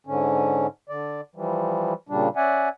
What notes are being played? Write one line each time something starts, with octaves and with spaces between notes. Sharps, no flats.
G#2 D3 C#4
D3 D5
E3 F3 G3
A#2 C#3 G3 D4
C#4 D5 E5 F#5 G#5